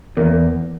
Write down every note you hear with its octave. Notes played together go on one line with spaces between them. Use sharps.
E2 A#3